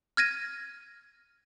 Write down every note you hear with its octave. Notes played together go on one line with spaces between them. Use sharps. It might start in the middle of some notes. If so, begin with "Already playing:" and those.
F6 G#6 A#6 D#7